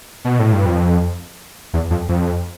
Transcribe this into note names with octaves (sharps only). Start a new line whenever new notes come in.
B2
A2
G2
F2
E2
F2
F2